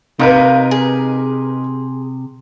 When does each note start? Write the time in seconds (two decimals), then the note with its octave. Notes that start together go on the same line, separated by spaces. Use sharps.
0.19 C3 A#3 D#4 A#4 B4
0.71 G#4